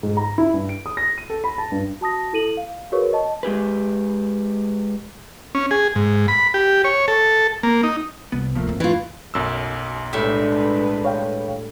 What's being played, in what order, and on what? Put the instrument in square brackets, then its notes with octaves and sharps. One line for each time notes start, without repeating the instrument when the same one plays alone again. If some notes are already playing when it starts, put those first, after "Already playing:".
[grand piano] G#2
A#5
E4
G2
D7
D#6
A#6
D#7
A4
B5
A5
G2
[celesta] F#4 A5 D#6 A#6
E4 A4 D#7 F#7
F5
F#4 G#4 A#4 B4 C#5 C#6
D#5 A5
[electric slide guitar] G#3 G4 G#4 B4
[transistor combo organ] C#4
G#4
G#2
B5
G4
C#5
A4
A#3
D#4
[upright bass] C2 [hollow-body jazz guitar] B3
[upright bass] D1 [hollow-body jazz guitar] F3 A3 A#3
[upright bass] F2 A2
[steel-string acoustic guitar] E3 F4 [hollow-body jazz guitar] A3
[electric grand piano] B1 F#2 E6
[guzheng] A2 G3 E5 [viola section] G#3 D4 B4
[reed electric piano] C#5 F5 G5